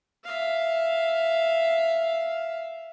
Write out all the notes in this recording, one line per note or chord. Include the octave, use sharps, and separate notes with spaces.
E5 F5